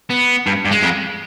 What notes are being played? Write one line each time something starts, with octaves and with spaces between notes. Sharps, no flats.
B3
G2
G2
G#3
F2